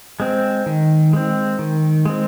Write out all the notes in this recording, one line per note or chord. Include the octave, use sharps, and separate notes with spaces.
G#3 C4
D#3
G#3 C4
D#3
G#3 C4